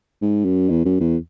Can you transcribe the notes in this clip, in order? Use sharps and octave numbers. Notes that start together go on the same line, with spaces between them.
G#2
F#2
E2
F#2
E2